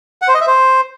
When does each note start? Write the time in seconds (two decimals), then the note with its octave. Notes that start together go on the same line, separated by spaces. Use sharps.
0.22 F#5
0.28 C5
0.35 D#5
0.41 E5
0.47 C5